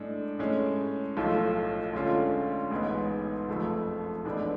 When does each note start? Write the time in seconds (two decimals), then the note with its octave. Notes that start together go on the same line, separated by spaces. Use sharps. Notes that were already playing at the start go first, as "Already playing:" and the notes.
Already playing: A2 G#3 D4
0.39 A2 G#3 C#4
1.16 B1 A2 F3 A3 F4
1.93 D2 D3 G#3 C#4 F4
2.71 A1 G#2 G#3 B3
3.48 F#1 F2 F3 A3
4.25 A1 A2 G#3 B3 D4